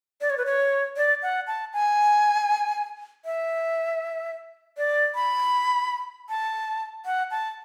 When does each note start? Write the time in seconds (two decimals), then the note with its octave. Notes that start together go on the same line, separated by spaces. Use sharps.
0.21 D5
0.30 C#5
0.38 B4
0.46 C#5
0.97 D5
1.23 F#5
1.47 A5
1.73 G#5
3.25 E5
4.77 D5
5.15 B5
6.29 A5
7.06 F#5
7.31 A5